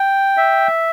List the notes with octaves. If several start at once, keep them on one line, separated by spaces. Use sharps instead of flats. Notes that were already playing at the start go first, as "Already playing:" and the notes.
Already playing: G5
E5